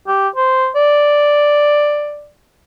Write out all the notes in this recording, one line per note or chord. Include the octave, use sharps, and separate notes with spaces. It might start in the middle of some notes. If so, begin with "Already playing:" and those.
G4
C5
D5